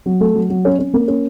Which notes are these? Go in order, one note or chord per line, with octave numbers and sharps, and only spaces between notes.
F#3
A3
F#3
F#3
C#4
C#4
A#3
C#4